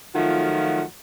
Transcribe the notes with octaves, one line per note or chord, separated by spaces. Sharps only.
D#3 F3 F#3 A3 F4 F#4